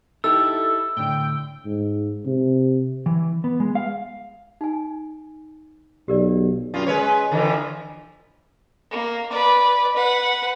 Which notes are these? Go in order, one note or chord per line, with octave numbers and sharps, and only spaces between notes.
D#4 E4 G4 A4 E6
A2 D3 G5
G#2
C3
E3
B3
G#3
F5
D#4 G#5
B1 G4 A#4 D5
F#2 F4
G#3 B4 C#5
D3 E3 F3
A#3
B4 D5
B4 F#5